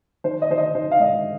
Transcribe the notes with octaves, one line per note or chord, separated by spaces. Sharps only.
D#3 C5
D#5
D#3 C5
D#5
D#3 C5
F5
G#2 D#5